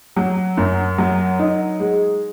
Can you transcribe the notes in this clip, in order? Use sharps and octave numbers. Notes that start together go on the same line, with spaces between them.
F#3
F#2
F#3
D#4
G#3